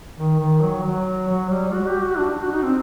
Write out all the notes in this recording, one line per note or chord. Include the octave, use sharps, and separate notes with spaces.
D#3
D#3
F#3
F#3
F#3
G3
F#4
G4
F#4
D4
F#4
D#4
C4